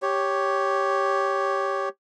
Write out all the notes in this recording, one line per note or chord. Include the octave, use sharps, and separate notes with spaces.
G4 C#5